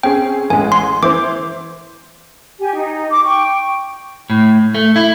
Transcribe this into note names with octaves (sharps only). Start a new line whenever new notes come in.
C4 C#4 G#4 G5
A1 G#3 G#5
C6
E3 C5 D6
G4 G#5
D#4
D6
G5 C#6
A2
A3
E4